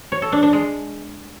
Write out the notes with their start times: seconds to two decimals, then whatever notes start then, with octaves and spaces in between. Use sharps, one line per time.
0.12 C#5
0.22 A4
0.32 D4
0.43 D4
0.53 G#3